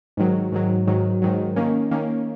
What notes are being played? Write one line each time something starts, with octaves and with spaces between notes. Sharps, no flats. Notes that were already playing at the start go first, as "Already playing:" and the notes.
G#2 D#3 F#3
G#2 D#3 F#3
G#2 D#3 F#3
G#2 D#3 F#3
D#3 A#3 C#4
D#3 A#3 C#4